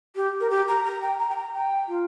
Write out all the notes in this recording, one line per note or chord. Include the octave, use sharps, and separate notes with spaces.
G4
A#4
G4
A#5
A#5
G5
A#5
G5
A#5
G5
F4